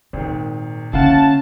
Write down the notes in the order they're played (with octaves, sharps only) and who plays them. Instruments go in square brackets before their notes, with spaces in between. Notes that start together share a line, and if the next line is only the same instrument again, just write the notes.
[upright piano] G#1 D#3 [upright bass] A#2
[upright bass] D3 A#3 [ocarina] C#4 [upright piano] E4 F5 F#5 [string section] A5